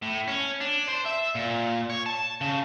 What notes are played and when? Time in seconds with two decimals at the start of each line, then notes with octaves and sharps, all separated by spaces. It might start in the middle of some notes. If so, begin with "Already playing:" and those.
0.02 A2
0.28 C#4
0.61 D4
0.88 C5
1.06 E5
1.35 A#2
1.90 C#5
2.06 A5
2.41 C#3